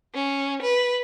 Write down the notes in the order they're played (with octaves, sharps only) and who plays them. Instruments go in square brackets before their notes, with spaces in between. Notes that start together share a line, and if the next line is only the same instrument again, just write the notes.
[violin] C#4
B4